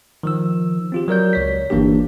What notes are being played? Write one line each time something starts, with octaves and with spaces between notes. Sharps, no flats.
D#3 F3 E6
C4 F4 G4
F#3 A#4 D5 G6
C#2 C#5 B6
G1 E3 A#3 D4 G4